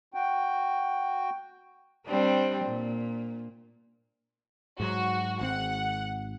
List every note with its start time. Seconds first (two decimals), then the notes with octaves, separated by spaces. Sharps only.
0.14 F#4 G5
2.08 G3 C4 D4
2.64 A#2
4.80 G#2 F#3 F#4
5.41 G#1 C4 F#5